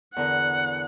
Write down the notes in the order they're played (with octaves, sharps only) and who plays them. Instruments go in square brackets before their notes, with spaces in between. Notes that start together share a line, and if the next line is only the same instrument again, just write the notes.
[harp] E2 D3 A#4 [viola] F#5